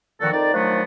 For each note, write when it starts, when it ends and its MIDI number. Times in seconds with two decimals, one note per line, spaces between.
0.21 0.31 46
0.21 0.31 50
0.21 0.31 51
0.21 0.31 53
0.21 0.31 66
0.21 0.31 69
0.32 0.54 41
0.32 0.54 51
0.32 0.54 63
0.32 0.54 74
0.54 0.82 51
0.54 0.82 53
0.54 0.82 54
0.54 0.82 57
0.54 0.82 59
0.54 0.82 62